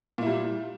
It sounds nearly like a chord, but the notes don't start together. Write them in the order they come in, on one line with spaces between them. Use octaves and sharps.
A#2 E4 G3